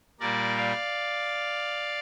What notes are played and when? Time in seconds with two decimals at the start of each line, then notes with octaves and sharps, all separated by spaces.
0.20 A#2 G3 A#3 A#4 D5
0.58 D5 F5